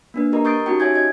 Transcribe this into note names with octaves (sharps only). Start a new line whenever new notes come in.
A#3 D4 B4
G4 A#4 D#5 A#5
C#6 D#6 G6 A6 C7 D7
C#4 D#4 F#4 G4 G5
C#5 E5 G#5 G6 G#6
D#5 G#6